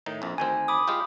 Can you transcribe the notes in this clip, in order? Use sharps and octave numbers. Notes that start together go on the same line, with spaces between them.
A2 D#3 D#4
A#1 F2
D2 D#3 C4 G#5
B5 D6 D#6
G#3 F4 G4